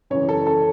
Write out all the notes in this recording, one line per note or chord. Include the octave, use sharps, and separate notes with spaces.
F#2 C#3 E3 C#5
A4
A4